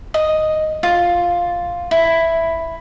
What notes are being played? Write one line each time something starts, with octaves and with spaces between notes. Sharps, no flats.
D#5
F4
E4